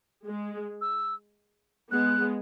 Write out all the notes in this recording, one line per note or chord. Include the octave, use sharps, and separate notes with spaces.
G#3
E6
G#3 B3 F#6